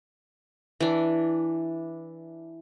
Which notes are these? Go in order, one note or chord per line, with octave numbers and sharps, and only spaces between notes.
E3 D4